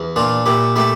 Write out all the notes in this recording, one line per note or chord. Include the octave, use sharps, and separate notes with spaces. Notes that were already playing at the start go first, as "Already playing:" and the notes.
Already playing: E2
A#2 D4 F4
A#2 E4 G4
A3 E4 G4